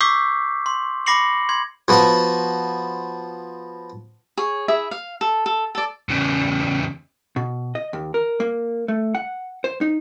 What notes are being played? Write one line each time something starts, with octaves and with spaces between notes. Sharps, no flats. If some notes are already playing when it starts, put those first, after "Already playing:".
C#6 D6 E6 G6 B6 C7
C6
B5 D6 A#6 C7 C#7 F#7
C6 G#6
F3 B3 F#4
G#4 C#5
E4 G#4 E5
F5
A4
A4
A4 D5
E2 C#3
B2
D#5
D#2
A#4
A#3
A3
F#5
C5
D#4